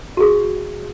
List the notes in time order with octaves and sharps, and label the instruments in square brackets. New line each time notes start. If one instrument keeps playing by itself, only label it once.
[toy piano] F#4 G#4